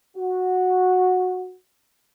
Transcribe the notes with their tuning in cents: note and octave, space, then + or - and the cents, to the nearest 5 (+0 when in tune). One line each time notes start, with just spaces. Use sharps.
F#4 -10